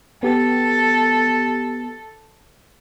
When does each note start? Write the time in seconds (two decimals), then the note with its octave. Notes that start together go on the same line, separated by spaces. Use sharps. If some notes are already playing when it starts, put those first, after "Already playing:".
0.23 B3 G4 A4